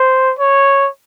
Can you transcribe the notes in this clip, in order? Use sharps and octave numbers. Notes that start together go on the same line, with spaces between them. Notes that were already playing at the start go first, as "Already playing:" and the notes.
Already playing: C5
C#5